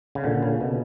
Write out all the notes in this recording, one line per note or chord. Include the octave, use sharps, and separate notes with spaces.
C#3
A#2 D3
C#3
B2